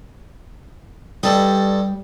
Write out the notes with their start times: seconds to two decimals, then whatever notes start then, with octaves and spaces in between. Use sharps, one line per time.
1.23 G2 G3 A4 D#5